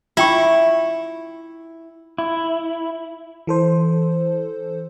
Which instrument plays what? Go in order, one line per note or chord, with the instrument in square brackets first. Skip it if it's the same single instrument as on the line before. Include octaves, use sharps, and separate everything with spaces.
[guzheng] E4 [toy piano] F4 G5 C#6
[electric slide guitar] E4
[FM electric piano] E3 A4 C5